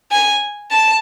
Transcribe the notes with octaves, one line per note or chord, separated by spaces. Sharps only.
G#5
A5